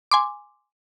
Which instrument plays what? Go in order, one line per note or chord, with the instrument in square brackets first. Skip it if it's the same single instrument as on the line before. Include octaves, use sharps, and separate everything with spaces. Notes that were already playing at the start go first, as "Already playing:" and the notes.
[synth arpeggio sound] G#5 C6 D6